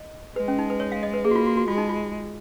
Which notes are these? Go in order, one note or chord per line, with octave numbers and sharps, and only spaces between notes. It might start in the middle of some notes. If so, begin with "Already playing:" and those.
Already playing: D#5
G#3 B4
C#4
D#4
B4
C#5
F5
D#5
B4
A#3 G#4
F#4
F4
F#4
F#4
G#3 F4
D#4
F4